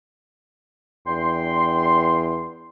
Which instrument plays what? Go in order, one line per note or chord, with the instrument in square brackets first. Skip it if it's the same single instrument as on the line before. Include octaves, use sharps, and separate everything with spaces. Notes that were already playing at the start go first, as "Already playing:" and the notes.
[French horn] E2 [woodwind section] D4 G5 C6